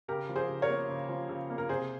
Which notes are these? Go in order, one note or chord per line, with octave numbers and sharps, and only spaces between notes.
C#3 G4 A#4
F3
G#4 C5
C#3
A#4 C#5
A#3
C#3
F3
C#3
A#3
A#4
C3 G#4 C5